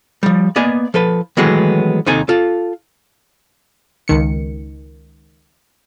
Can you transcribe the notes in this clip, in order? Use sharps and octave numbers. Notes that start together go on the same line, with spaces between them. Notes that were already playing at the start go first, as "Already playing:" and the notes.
F3 G3
A#3 B3 D5 D#5 G#5
F3 A4 B4
D#3 E3 F#3 G#3 A3 B3
D#2 C3 D#4 A4 G#5
F4 A4
C#2 D#3 C#7